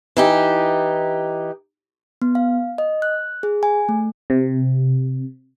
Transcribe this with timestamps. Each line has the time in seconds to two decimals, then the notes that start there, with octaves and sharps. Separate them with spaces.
0.17 E3 D#4 G4
2.22 B3
2.35 F5
2.78 D#5
3.02 F#6
3.43 G#4
3.63 G#5
3.89 A3
4.30 C3